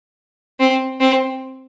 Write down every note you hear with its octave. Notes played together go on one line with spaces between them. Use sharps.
C4
C4